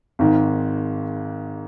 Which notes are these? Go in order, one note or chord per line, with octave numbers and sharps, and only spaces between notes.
G#1 G#2 D#3